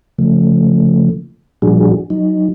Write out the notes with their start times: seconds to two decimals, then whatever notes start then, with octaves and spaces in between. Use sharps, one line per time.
0.18 C#3 F3 A3
1.62 A#2 F3 G3 D4 F#4 G#4
2.10 F#3 D#4